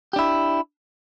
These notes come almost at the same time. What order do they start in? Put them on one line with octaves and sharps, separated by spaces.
G4 D4 E4